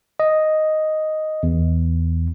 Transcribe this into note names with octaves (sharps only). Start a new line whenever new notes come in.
D#5
E2